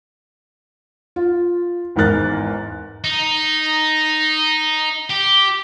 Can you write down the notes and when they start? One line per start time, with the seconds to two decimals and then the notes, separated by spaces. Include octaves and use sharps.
1.16 F4
1.96 G#1 E2 G#2 A#4 F#6 A6
3.04 D#4
5.10 G4